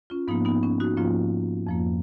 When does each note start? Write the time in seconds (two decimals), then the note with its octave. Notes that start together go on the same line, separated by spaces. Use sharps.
0.10 C#4 F4
0.28 G#2 F3 A#3 B3 D#4
0.45 B3 D#4
0.63 C#4
0.80 D#4 F#4
0.97 G#2 F3 A#3 C#4 F4
1.67 F2 F3 A#3